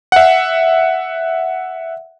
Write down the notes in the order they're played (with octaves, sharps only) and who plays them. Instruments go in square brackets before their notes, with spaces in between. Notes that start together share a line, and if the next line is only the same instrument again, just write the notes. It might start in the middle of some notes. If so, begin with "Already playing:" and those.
[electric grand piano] E5 F#5